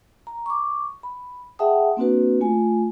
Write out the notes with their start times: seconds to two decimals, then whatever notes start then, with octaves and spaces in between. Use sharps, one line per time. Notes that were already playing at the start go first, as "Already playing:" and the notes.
0.27 A#5
0.46 C#6 D6
1.03 B5
1.59 G#4 E5 F#5 G5 A5 D#6
1.97 A#3 C4 D4 F#4 B4
2.41 A3 F4 G#5